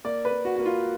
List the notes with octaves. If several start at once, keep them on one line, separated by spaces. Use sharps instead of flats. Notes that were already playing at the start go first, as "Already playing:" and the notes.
A#3 D5
B4
A#3
F#4
A#3 F#4
F4